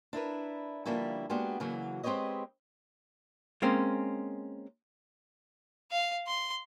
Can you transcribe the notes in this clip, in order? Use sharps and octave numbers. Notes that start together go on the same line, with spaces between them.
D4 E4 A#4 B4
D3 F3 G3 A#3 C#4 E4
G#3 A#3 B3 D4 F#4 G4
C#3 E3 F#3 A#3 F#4
G#3 C4 G4 B4 C#5 D#5
G#3 A#3 C4 C#4
F5
C6